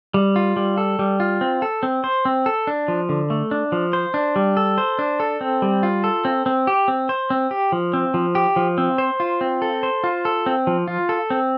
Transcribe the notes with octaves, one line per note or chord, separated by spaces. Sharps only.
G3
F4
G3
A4
G3
F4
C4
A4
C4
C5
C4
A4
D4
F3
D3
A3
D4
F3
C5
D4
G3
A4
C5
D4
A4
C4
G3
F4
A4
C4
C4
G4
C4
C5
C4
G4
F3
C4
F3
G4
F3
C4
C5
F4
C4
A4
C5
F4
A4
C4
F3
F4
A4
C4